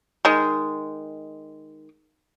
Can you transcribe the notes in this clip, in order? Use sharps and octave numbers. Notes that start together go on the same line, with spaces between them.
D#3 G#3